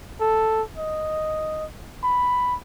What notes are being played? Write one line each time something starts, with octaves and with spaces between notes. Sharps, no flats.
A4
D#5
B5